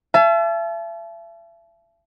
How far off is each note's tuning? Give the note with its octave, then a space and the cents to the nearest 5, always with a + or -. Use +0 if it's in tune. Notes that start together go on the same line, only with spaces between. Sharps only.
E5 +40 A5 -35